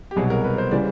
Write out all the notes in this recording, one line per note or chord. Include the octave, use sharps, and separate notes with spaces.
G4
C2 B2 F#3 G#4
A#4
B4
C5
C#3 E3 G3 D5